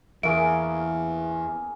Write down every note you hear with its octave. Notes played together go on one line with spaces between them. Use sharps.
E2 A#3 C#4 G#4 E5 D7